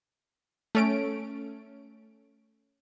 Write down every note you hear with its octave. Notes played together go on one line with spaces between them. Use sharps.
A3 C#4 D7